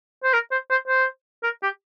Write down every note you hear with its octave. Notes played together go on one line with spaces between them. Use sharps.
C5
A#4
C5
C5
C5
A#4
G4